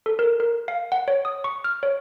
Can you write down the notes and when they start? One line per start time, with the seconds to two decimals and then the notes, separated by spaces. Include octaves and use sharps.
0.06 A4
0.19 A#4
0.40 A#4
0.68 F5
0.92 F#5
1.08 C#5
1.25 D#6
1.44 C#6
1.64 F6
1.83 C#5